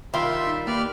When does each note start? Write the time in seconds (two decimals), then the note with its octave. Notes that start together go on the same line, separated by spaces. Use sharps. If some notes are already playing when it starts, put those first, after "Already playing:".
0.14 D#3 G3 F4 E5 C6
0.47 D#4
0.67 A#3 G4 B4 D5 F6